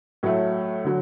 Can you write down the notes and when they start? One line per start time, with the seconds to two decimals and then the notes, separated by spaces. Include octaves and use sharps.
0.23 A2 F#3 A3
0.84 D3 F#3